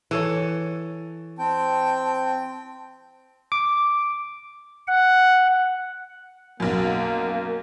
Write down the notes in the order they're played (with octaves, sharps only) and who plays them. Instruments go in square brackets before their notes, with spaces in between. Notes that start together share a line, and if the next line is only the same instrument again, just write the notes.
[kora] E3 A4 C#5
[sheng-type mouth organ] C4 G5 [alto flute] A5
[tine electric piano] D6
[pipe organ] F#5
[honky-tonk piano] B1 F#2 [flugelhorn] A#3